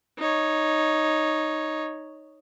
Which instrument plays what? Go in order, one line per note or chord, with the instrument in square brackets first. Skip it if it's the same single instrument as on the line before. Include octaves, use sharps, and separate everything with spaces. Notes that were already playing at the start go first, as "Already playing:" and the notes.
[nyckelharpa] D#4 C#5